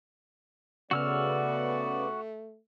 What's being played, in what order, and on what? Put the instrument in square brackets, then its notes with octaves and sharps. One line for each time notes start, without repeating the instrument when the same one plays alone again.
[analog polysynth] C#3 [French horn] A3 [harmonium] B3 D5 [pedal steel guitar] F#4 E6 F6